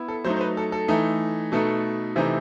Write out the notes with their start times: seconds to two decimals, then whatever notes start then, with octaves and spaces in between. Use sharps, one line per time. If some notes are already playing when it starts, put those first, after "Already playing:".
Already playing: B3 E4
0.08 A4
0.24 F#3 A3 D#4 C5
0.36 C5
0.41 B4
0.57 A4
0.72 A4
0.88 E3 A3 D#4
1.52 B2 A3 D#4 A4
2.16 C3 E3 A3 C4 D#4